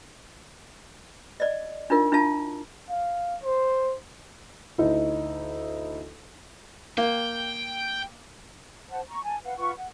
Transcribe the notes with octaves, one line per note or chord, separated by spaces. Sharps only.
D5 D#5
D4 D#4 F4 A#4
D4 E4 F4 E5 A5
F5
C5
D2 D#4 E4
A#3 G5
C5 F#5 A5
A#5 C#6
G#5 A5
B4 F5 F#5
F4 B4 F#5 C#6
F#5